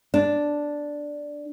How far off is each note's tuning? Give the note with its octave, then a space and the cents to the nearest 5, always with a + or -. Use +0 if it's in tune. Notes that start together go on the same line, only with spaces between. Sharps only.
D4 +0